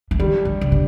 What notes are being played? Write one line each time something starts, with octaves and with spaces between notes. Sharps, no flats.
E3
D#3 G3
D3
C#3
D3